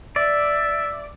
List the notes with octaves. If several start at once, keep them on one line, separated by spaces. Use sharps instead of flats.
D5 E5